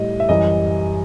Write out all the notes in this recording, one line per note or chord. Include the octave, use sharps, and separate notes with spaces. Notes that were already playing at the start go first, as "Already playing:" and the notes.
Already playing: A2 G3 D#5
E5
F#2 E3 G3 D#5